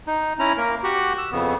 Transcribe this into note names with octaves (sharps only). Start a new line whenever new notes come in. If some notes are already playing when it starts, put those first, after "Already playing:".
D#4
C#4 E4 A#5
A#3 A#4
F#4 G4 F#5
E6
F2 C#3 B3